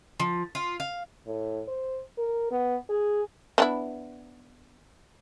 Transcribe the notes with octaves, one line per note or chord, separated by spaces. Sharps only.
F3
F4
F5
A2
C5
A#4
B3
G#4
B3 D4 E4